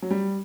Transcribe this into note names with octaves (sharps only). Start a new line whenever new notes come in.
F#3
G3